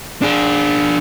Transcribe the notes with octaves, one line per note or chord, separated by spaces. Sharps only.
D4 G#4